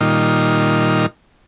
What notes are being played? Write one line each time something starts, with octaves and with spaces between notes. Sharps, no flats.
A#2 D#3 G3 D#4 F4